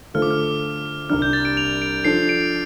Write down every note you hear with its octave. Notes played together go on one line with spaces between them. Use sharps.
D3 A3 F4 A4 C5 F6
D6
F6
C2 C3 G3 D4 F6
G6
A6
D7
F7
D7
F3 D4 A4 C7
D7